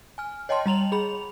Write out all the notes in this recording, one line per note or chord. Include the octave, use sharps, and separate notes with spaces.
G#5 F6
C#5 D#5 G5 A5 C6
G3 A#5 F7 F#7
G#4 B5 F7